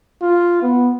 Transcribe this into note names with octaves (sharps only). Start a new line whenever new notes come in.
F4
B3